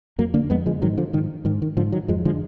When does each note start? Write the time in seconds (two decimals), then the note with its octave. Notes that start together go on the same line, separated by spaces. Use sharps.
0.18 F2 F#3 A#3
0.34 D3 A#3 D4
0.50 F2 G#3 B3
0.66 D3 F3 G#3
0.82 G#2 D#3 F#3
0.98 D3 F3
1.13 G#2 D#3
1.45 G#2 D#3
1.62 D#3
1.77 G#2 D3 F3
1.92 D#3 F#3
2.08 F2 F3 G#3
2.25 D3 F3 G#3